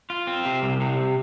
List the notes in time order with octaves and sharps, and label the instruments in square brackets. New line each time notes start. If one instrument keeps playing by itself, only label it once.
[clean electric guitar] F4
C4
C3
C2
C3